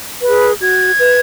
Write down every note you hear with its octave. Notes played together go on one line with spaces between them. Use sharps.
G#4 B4
F#4 G#6
B4